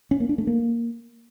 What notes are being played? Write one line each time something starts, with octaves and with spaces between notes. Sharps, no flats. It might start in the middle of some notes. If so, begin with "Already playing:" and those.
C#4
A#3
D4
A3
A#3